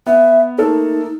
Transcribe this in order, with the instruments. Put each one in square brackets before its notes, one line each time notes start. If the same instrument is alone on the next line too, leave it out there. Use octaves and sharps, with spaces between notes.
[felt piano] B3 [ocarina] E5
[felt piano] A3 A#3 A4 [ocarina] D#4